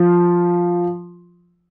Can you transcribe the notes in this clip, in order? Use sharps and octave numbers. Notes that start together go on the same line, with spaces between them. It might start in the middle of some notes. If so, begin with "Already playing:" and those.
Already playing: F3